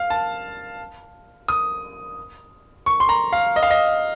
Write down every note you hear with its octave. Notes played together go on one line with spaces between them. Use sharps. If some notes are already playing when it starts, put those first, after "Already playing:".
Already playing: F5
A5
D#6
C#6
C6
A#5
F5
D#5
F5
D#5